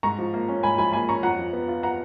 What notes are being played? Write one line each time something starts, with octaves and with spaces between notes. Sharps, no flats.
G#2 A#5 C#6
F3
A#3
C#4
G#2 G#5 B5
F3 G#5 B5
A#3 G#5 B5
C#4 A#5 C#6
F2 F#5 A#5
F3
B3
F4
F#5 A#5